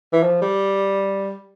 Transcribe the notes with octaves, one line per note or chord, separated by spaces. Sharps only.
E3
F3
G3